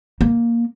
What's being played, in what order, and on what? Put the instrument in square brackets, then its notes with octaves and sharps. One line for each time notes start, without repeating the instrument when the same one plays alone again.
[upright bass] A#3